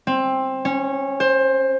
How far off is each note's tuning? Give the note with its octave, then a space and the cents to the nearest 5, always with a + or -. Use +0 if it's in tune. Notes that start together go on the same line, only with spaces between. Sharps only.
C4 +15
C#4 -15
C5 +20